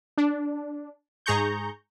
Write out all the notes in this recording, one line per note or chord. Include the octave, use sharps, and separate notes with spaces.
D4
G#2 G#4 A#5 C#6 G6